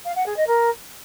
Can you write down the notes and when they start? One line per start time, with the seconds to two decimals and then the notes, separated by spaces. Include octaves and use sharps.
0.05 F5
0.16 F#5
0.26 G#4
0.37 D#5
0.47 A#4